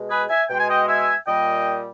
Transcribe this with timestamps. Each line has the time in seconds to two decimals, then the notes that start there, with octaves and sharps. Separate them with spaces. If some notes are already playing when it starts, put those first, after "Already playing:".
Already playing: B2 G#3
0.10 G#4 B4
0.29 E5 G#5
0.49 B2 G#3 G5
0.59 G#5
0.69 D#5 G5
0.88 E5 G#5
1.27 A#2 G3 D#5 G5